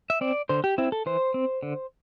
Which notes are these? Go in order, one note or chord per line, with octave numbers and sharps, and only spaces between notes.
E5
C4 D5
D3 C5
G4
C4 E4
A4
E3 C5
C4
D3